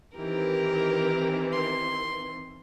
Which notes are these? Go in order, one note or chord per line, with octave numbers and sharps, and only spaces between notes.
D#3 E3 C4 G4 A#4
C6